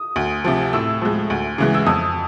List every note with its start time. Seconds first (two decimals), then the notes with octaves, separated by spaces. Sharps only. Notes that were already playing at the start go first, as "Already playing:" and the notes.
Already playing: D#6
0.16 D2
0.44 C3 F3
0.73 A2 E6
1.01 F3 G#3
1.30 D2
1.58 C#3 E3 G#3
1.74 E6
1.86 F2 D#6